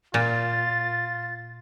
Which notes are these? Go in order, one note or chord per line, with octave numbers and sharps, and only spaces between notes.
A#2 F4 A6